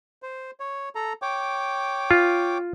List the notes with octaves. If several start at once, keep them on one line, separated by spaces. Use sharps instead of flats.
C5
C#5
A4 A#5
C#5 G5 D6
F4